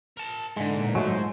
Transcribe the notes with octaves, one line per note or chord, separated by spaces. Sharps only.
A#4 A5
G#2 D3 E3 G#3
E2 A#2
F#3 G#3 A3
F4 C5 D#5